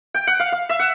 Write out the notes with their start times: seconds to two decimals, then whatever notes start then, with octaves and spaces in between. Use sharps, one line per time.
0.14 G5
0.27 F#5
0.40 F5
0.52 F5
0.69 E5
0.79 F#5